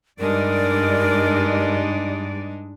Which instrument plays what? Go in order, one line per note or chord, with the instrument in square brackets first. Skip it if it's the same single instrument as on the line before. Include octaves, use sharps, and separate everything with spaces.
[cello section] G2 D5 [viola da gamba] G#3 D4 D#4 [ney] A#4